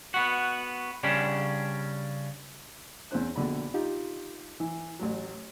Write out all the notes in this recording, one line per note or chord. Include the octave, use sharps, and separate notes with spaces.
B3 F#4
C#3 G3 C#4 D4
E2 C4 C#4 C5 F#6
A#1 B2 D3 D5 B5
D#4 F4 G4
E3
A1 A2 F#3